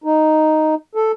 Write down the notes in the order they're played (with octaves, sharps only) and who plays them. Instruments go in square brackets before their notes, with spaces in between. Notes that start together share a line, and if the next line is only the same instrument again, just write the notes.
[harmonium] D#4
A4